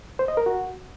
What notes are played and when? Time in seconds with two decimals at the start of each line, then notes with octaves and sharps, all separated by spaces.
0.19 C5
0.28 D#5
0.37 A#4
0.46 F#4